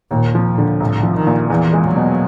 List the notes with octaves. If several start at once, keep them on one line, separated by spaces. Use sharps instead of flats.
D#2 A#2
F3
D3
C2 A2
F3
D#3
A#2
E2 E3
G#3
F#3
B2